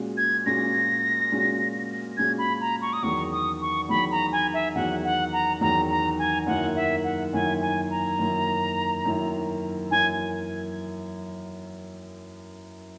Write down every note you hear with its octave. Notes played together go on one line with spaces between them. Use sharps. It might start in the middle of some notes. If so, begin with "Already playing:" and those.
Already playing: A#2 G#3 C#4 F#4
G#6
A#2 G#3 C#4 F#4 A#6
A#2 G#3 C#4 F#4
A#2 G#3 C#4 F#4 G#6
B5
A#5
C#6
D#6
E2 D#3 F#3 C#6
D#6
C#6
E2 D#3 F#3 B5
A#5
G#5
E5
E2 D#3 F#3 F#5
F#5
A#5
E2 D#3 F#3 A#5
A#5
G#5
F#2 D#3 A#3 E4 F#5
E5
F#5
F#2 D#3 A#3 E4 G#5
G#5
A#5
F#2 D#3 A#3 E4
F#2 D#3 A#3 E4
F#2 E3 A#3 G#5